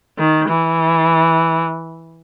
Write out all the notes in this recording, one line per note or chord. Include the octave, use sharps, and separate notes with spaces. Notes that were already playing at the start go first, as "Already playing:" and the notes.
D#3
E3